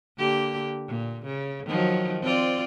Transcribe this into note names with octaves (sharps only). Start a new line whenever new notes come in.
D3 A#3 G4
A#2
C#3
D#3 F3 F#3
C4 F4 D5